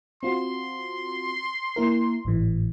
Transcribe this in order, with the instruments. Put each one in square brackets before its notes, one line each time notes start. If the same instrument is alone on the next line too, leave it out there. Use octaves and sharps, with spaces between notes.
[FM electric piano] C4 F4 F#4 [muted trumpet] C6
[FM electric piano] A#3 E4 A#4
G#1 A2 E3